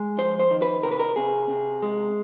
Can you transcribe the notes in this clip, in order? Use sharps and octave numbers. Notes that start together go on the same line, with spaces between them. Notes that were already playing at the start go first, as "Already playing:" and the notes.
Already playing: G#3
F2 C5
C5
D#3
B4
C3 A#4
B4
A#4
C3 G#4
C3
G#3